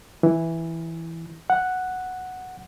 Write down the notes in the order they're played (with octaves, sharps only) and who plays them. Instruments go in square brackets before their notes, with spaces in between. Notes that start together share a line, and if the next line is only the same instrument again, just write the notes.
[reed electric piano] E3
F#5